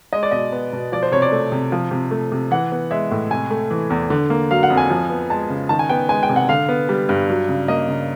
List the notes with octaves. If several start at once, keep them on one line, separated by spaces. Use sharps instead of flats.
G#3 D#5
D5
B2 D#5
B3
B2
F3 D5
C5
C3 C#5
D5
A3
C3
F3
C3
A3
C3
E3 F#5
B3
G#3 E5
A2
C3 G#5
A3
E3
E2
D3
A#3
F#3 F5
F#5
F2
G#5
F3
B3
G#3 A5
C#3
D#3 A5
G#5
B3 G5
G#3 G#5
G5
C3
F#5
D3 F5
B3
G3
G2
F#3
C#3
A#3 D#5
C#3